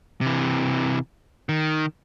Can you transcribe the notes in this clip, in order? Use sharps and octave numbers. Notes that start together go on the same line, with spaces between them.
C3 E3
D#3